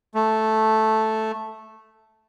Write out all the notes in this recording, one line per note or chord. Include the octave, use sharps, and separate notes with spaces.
A3